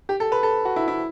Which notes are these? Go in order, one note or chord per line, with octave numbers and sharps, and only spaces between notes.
G4
A4
B4
A4
F#4
E4
E4